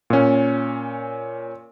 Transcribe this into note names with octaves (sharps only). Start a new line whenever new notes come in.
A#2 C#4